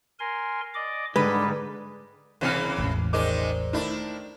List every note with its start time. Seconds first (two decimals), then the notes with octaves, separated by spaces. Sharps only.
0.20 A#4 G#5 C6
0.74 D5 D#5 D6
1.16 G#2 D3 G3 G#3 B4
2.41 C2 C#3 E3 A#3 C4 F6
2.78 E1 A1
3.13 D#3 G#3 D#4 A#4 C5 D5 D6
3.73 D#3 A3 D4 E4